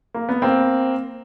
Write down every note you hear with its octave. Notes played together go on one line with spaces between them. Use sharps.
A#3
B3
A#3 C4